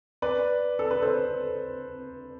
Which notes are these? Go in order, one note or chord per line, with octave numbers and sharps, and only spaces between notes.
B4 D5
A4
B4
A4 C5